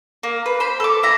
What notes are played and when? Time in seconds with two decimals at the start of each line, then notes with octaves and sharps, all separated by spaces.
0.23 A#3
0.46 B4
0.60 C5 B5
0.80 A4 D6
1.03 E4 A#5